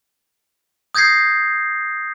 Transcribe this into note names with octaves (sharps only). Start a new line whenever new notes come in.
D#6 G6 G#6 A#6 C7